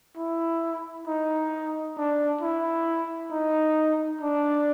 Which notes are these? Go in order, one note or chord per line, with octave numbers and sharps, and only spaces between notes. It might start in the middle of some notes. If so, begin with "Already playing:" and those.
E4
D#4
D4
E4
D#4
D4